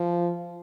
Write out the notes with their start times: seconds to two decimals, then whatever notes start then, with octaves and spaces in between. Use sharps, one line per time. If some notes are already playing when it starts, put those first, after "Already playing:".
Already playing: F3